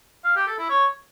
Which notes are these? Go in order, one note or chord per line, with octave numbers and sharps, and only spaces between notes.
F5
G4
A4
E4
C#5